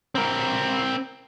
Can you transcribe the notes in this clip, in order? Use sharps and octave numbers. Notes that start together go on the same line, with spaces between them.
C4 A#4